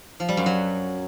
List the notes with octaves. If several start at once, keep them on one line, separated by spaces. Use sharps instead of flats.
F3
G3
F#2
F#3